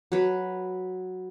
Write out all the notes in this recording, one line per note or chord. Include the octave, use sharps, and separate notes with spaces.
F#3 B4